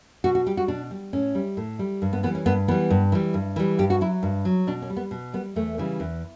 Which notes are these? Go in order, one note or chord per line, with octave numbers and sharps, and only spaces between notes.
B2 F#4
F#4
G3 G4
F#4
B2 D4
G3
A2 C#4
G3
A2
G3
G2
B3
E3 G3 B3
C#4
G2 B3
E3 G3 B3
G2
E3 G3
G2
E3 G3
G2 G4
F#4
F#3 E4
G2
F#3
B2 D4
C#4
G3
B3
B2
G3 B3
E2 A3
C#3 E3 G3
E2